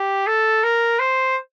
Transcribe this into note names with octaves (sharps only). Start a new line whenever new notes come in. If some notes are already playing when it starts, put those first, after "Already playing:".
Already playing: G4
A4
A#4
C5